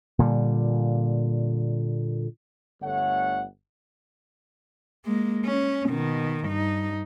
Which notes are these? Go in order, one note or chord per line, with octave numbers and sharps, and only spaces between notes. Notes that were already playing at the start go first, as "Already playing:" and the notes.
A#2 D3 G3
G1 D3 A3 C#5 F#5
G#3 A#3
C#4
B2 D#3
G2 D#4